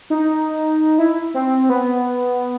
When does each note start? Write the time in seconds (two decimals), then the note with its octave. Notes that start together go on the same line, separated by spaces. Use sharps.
0.10 D#4
0.99 E4
1.34 C4
1.69 B3